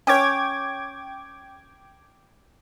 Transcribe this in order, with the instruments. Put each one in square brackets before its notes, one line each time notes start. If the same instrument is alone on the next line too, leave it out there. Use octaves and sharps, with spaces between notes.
[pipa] C#4 C#5 [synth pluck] G5 D6 G#6